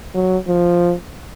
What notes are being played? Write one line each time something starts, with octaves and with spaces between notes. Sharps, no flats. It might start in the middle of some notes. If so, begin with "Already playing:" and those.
F#3
F3